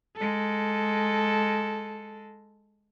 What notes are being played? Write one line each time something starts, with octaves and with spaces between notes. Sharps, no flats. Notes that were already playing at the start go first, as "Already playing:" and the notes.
G#3 A4